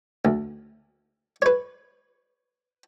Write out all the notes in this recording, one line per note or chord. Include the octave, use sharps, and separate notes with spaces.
D2
B4 C#5